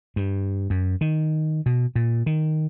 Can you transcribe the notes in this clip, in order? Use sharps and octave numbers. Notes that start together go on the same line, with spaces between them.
G2
F#2
D#3
B2
A#2
D#3